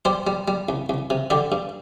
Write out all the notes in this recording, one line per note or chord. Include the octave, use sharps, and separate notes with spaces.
G3 G4 C5
G3
G3
C2
C2
C3
D3 D4 G4
G2